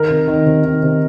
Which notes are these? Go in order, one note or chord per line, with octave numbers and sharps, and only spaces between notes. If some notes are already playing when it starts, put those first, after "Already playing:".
Already playing: D#3 A#4
C3
D#3
C3
D#3
C3